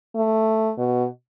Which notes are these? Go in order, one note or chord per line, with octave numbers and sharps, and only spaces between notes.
A3
B2